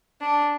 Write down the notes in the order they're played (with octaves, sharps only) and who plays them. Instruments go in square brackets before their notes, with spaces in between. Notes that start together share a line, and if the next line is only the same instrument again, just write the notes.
[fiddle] D4